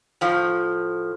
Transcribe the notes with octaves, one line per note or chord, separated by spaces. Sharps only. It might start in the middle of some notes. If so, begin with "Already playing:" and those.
A2 F3